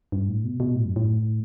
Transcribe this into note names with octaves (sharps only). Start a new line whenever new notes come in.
G2
A2
B2
B2
A2
F#2
A2